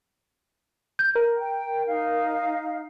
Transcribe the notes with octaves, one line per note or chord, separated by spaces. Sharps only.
G6
A#4
G5
D#4 F5